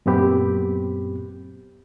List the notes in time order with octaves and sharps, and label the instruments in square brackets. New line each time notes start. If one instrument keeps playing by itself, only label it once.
[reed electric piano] F#2 A#2 B3 C4 G4 B5